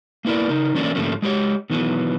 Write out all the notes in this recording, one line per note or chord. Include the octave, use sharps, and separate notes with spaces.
A#3 B3 E4 A#4 D5
C#3 D#4 A#4
E3 F#3 A3 A#3 C#4 D4
G#2 D3 F3 A3 A#3 C#4
G#3 G4 B4 C#5
B2 D#3 E3 F#3 B3